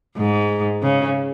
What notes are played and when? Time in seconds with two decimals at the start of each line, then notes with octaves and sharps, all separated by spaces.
0.17 G#2
0.82 C#3